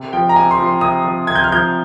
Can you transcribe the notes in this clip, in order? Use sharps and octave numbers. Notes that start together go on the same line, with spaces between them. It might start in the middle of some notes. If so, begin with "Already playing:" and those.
Already playing: C3
F3 G5
A#5
C3 G#5
C6
F3
C6
C3 D#6
F3
C3 G#6
G6
F6
F3 G6